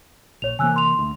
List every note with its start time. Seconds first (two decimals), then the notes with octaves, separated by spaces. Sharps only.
0.42 A#1 C#5 F7
0.59 C3 E3 A#3 G#5 E6 F#6
0.76 C6 F7
0.99 D2